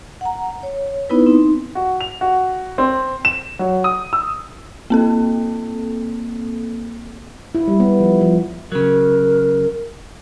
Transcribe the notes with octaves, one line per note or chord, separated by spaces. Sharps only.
F#5 A#5
C#5
B3 D#4 E4 B4
C4 D#4
F#4
F7
F#4
C4
E7
F#3
D#6
E6
A#3 C4 A4
E4
G3
B3
F3
F3
C#3 F#3 A#4